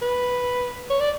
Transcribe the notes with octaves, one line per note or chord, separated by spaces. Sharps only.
B4
C#5
D5